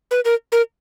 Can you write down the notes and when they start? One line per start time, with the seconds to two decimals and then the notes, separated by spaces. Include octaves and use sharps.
0.11 B4
0.25 A#4
0.52 A#4